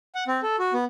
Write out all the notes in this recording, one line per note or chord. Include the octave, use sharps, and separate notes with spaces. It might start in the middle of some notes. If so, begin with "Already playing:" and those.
F#5
C4
A4
F#4
B3